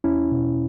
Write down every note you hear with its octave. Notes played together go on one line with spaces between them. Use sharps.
E2 C#4 E4
B2